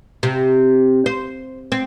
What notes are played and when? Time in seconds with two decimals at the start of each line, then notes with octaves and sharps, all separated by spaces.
0.23 C3
1.06 C5
1.72 C4